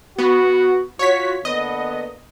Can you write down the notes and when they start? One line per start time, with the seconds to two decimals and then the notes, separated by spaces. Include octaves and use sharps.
0.18 B3 F#4
0.99 F4 F#4 C#5 B6
1.45 D3 A#3 B3 D#5